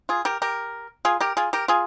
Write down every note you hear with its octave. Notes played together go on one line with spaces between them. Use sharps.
F4 G#4
G4 A#4
G4 A#4
F4 G#4
G4 A#4
F4 G#4
G4 A#4
F4 G#4